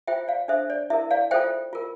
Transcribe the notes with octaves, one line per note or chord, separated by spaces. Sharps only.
F4 C5 E5 G5
D5 F5
D4 A4 C5 E5
D5
E4 A#4 E5
D5 F5
F4 A4 C5 E5 G5
F4 A#4